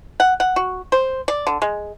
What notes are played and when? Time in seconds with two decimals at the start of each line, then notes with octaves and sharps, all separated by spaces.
0.20 F#5
0.40 F#5
0.56 F#4
0.92 C5
1.28 D5
1.47 D3
1.62 G#3